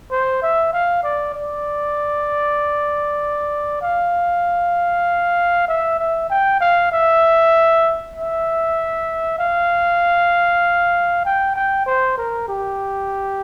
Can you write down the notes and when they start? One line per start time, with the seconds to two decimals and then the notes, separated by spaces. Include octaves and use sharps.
0.11 C5
0.42 E5
0.73 F5
1.03 D5
1.35 D5
3.82 F5
5.68 E5
5.99 E5
6.30 G5
6.60 F5
6.92 E5
8.16 E5
9.39 F5
11.25 G5
11.55 G5
11.86 C5
12.17 A#4
12.48 G4